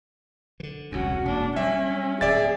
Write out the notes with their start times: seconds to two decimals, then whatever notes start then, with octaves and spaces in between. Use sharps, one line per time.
0.60 D3 E3
0.92 E1 C2 F#2 C#4 F#4
1.25 E1 A#3 D4
1.56 F#3 G3 C#4 E5
2.21 D1 G#4 D5 E5 A6